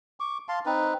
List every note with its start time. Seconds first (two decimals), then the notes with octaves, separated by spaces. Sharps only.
0.20 C#6 D6
0.48 F5 A5 C6
0.66 C4 D#4 B4